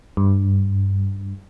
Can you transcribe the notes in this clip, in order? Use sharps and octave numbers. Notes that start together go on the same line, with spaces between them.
G2